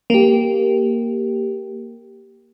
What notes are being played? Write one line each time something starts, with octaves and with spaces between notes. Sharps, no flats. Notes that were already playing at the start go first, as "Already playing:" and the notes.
A#3 G4